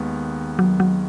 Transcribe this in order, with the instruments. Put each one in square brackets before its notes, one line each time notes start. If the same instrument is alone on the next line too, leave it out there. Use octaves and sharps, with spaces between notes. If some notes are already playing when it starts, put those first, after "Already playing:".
Already playing: [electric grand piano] D#2 D#3 G#3 B3
[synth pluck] F#3
F#3